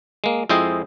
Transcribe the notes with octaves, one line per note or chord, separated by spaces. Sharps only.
G#3 A#3
F2 G#3 E4 C5 D#5 G5